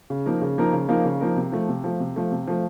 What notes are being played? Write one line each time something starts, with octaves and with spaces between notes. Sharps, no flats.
C#3
F3 A#3 D#4 A#4
C#3
F3 A#3 D#4 A#4
C#3
F3 A#3 D#4 A#4
C#3
F3 A#3 D#4 A#4
C3
F3 A3
C3
F3 A3
C3
F3 A3
C3
F3 A3